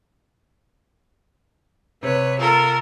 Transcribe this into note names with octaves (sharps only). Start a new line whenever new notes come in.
C3 B4 C#5
F4 A4 A#4